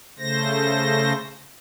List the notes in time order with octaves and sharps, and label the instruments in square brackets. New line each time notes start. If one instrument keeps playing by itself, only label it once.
[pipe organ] C#3 A3 C5 A#6